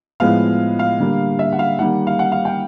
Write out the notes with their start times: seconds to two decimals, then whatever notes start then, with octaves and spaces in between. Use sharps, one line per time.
0.20 A2 F3 G#3 B3 F5
0.79 F5
1.00 D3 G3 A#3
1.39 E5
1.52 F#5
1.59 F5
1.79 D#3 G3 A#3 F#5
2.07 F5
2.19 F#5
2.32 F5
2.45 G5